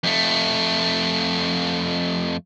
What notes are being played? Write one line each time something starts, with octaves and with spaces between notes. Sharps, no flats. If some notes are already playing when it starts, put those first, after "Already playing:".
F2 A3